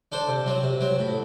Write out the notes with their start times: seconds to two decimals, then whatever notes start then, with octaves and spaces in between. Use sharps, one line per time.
0.12 D4 A4 C5
0.29 C3
0.46 F#3 C4
0.63 C3
0.81 F#3 C4
0.99 A2